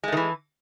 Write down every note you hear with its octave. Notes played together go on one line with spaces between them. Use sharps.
D#3 E3 G#3 A3